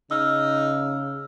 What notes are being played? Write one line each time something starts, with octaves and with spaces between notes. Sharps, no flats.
C#3 D#4 E6 F6